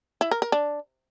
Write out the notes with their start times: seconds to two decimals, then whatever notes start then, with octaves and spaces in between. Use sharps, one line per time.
0.21 E4
0.31 A#4
0.42 A#4
0.52 D4